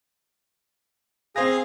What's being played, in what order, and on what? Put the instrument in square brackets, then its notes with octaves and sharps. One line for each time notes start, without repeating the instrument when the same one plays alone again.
[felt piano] C4 C5 A#6 [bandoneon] G#4 [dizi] F5